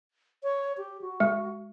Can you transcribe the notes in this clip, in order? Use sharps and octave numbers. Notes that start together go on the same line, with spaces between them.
C#5
G4
F#4
G#3